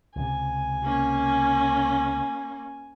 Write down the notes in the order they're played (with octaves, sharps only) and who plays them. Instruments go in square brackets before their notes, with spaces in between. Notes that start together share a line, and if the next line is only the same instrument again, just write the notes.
[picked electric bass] C#2 C3 [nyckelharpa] G#5
[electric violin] A#3 C#4